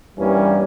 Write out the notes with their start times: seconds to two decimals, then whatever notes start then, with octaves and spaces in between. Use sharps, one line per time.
0.17 G2 E3 G3 A#3 C#4